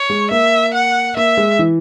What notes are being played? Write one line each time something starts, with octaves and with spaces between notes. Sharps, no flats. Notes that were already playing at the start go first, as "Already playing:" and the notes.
Already playing: C#5
G#3
A#3 E5
F#5
A#3 E5
G#3
E3